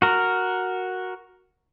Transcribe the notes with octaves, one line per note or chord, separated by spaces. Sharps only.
F#4 A#4